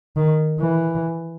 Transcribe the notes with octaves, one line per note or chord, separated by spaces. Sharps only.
D#3
E3